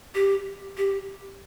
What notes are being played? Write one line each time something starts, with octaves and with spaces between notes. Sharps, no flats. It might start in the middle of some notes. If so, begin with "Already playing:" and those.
G4
G4